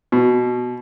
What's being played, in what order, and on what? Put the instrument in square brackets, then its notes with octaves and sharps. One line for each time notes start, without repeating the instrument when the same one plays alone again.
[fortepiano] B2